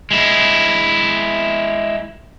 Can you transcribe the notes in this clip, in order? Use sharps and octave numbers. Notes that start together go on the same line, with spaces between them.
G#3 E4